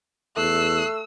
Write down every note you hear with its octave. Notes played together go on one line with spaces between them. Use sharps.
E2 A3 E6 F#6 C7